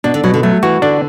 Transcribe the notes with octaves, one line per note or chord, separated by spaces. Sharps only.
B2 D4
D3
B2 F#3
D3
F#3 A3
E3 F#4
D3 D4